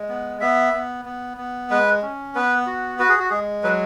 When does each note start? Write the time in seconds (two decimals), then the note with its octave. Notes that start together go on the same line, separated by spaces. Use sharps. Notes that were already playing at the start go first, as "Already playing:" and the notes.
Already playing: G#3
0.09 B3
0.40 B3 E5
0.74 B3
1.05 B3
1.37 B3
1.70 G#3 B4
2.02 C#4
2.35 B3 B4
2.67 F#4
2.99 F#4 B4
3.09 G#4
3.19 F#4
3.30 G#3 G#4
3.63 F#3 B4